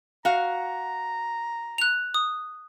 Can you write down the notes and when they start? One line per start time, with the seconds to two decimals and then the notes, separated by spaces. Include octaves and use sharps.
0.25 F#4 F5 A#5
1.78 F#6 F7
2.14 D#6